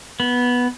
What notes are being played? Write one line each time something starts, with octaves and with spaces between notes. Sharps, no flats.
B3